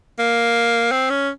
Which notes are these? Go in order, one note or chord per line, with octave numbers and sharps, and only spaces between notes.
A#3
C4
C#4